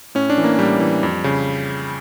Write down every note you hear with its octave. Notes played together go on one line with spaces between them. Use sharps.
A2 C#4
D4
E3
A#3
A2 G3
E3
F2
C#3